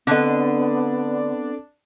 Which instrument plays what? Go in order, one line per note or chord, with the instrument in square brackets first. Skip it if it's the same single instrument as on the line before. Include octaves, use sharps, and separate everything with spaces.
[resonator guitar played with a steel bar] D3 D#5 [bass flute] B3 [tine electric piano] C4 A4 [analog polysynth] D4